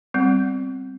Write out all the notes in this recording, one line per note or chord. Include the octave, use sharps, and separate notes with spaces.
G3 B3 C4